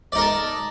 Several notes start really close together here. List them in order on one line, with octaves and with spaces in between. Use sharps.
D5 D#4 A#4 A5